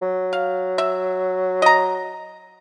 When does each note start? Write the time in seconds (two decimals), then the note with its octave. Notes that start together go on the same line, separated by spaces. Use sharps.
0.02 F#3
0.33 F5
0.78 E5
1.62 D#5 A#5